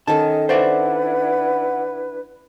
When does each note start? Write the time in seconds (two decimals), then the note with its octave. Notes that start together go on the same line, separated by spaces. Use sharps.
0.07 D#3 C#4 A4 D#5 A5
0.49 D4 E4 B4 C5 D5 E5 F#5